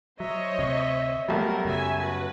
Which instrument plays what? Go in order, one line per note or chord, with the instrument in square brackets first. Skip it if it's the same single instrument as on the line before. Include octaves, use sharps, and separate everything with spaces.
[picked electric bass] F#3 [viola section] C5 C#5 D#5 [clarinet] E5
[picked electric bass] D2 C3
[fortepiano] B1 G3 [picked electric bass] F#3 [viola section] A3 A#4
[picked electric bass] F#2 C#3 [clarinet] F#4 [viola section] E5 G#5
[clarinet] F#4 [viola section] B4